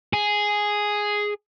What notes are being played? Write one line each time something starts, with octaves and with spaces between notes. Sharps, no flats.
G#4